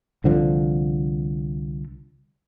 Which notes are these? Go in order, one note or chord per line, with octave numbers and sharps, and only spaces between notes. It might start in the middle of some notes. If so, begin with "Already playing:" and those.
C2 D3 F3